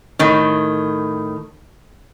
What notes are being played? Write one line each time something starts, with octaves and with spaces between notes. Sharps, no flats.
A2 D#3